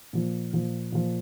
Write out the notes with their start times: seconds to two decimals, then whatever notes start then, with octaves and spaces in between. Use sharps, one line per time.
0.13 A#2 F3
0.53 A#2 F3
0.92 A#2 F3